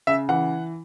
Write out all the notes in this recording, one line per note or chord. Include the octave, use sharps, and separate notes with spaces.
C#3 E5
E3 F#5